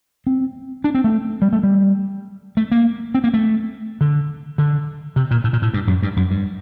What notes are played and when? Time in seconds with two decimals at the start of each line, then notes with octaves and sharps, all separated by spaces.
0.27 C4
0.84 D4
0.95 C4
1.04 A3
1.42 G3
1.53 A3
1.63 G3
2.57 A3
2.72 A#3
3.15 C4
3.24 A#3
3.34 A3
4.01 D3
4.58 D3
5.16 C3
5.31 A#2
5.44 A2
5.53 A#2
5.62 A2
5.74 G2
5.87 F#2
6.03 G2
6.17 F#2
6.31 G2